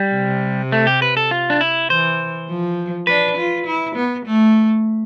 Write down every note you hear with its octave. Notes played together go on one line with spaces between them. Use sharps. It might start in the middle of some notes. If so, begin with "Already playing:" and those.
Already playing: G3
C3
A3
G4
B4
A4
F4
D4
E4
E3 C5
F3
D4 B4
F4
E4
B3
A3